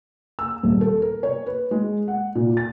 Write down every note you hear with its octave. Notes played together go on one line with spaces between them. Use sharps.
E6
D#1
A4
A#4
C#5
B4
G#3
F#5
A#2
A6